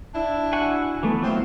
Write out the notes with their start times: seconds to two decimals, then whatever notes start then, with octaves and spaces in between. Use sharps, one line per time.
0.15 D4 E4
0.53 F#4 F#5 G#5
1.03 E3 A3 B3
1.23 F#3 C4 E4 F4